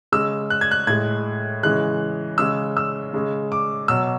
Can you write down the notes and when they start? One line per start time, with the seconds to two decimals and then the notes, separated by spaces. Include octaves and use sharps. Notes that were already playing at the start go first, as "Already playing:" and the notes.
0.12 C#3 G#3 E6
0.50 F#6
0.61 G#6
0.71 F#6
0.87 A2 G#3 G#6
1.63 C#3 E3 G#3 F#6
2.38 C#3 G#3 E6
2.77 E6
3.13 C#3 G#3
3.52 D6
3.88 B2 F#3 E6